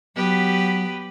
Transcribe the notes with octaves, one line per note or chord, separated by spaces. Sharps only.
F#3 B3 G4 B4